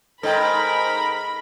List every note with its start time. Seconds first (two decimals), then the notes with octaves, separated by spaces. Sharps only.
0.23 G#2 A4 A#4 D#5 G5 B5